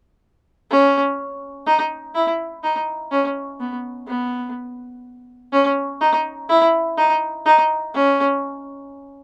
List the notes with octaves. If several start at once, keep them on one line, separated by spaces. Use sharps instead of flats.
C#4
D#4
E4
D#4
C#4
B3
B3
C#4
D#4
E4
D#4
D#4
C#4